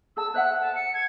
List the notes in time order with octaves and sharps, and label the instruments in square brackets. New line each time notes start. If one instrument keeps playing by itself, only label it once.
[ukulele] G#4 A5 [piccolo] E6
[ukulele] C5 E5 F#5 [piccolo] F#6
[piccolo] A5
C#7
G#6